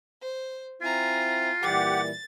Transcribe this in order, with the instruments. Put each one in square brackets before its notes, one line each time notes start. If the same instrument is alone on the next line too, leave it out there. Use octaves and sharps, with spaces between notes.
[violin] C5
[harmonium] C4 E4 [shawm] F4 [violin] G#5 A#5
[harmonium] A#2 E3 G3 [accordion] G4 F#5 [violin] A6